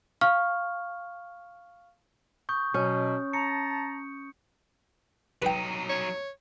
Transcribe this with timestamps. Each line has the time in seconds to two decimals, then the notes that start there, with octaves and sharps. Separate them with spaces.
0.21 F5 C#6 F6
2.49 C#6 D#6 G6
2.74 B2 F#3 C#4
3.33 A5 A#5 C#7
5.42 F#3 D#4 B4 G5
5.89 C#5